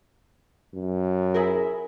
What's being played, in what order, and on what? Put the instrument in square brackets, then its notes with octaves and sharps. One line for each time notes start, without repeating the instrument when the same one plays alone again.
[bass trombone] F#2
[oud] E4 G#4 A#4